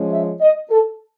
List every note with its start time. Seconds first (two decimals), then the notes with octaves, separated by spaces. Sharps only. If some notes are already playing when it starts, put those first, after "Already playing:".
Already playing: F3 G#3 C#4
0.10 E5
0.41 D#5
0.71 A4